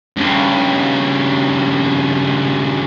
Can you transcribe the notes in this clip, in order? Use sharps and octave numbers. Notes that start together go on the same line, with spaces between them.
G2 C#3